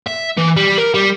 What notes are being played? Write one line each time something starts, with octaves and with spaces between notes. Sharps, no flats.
E5
E3
G3
A#4
G3